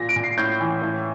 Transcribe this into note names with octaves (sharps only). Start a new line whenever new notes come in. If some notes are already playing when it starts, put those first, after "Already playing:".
Already playing: A#2 A#6
D7
A#2
C7
A2 G6
E3
A2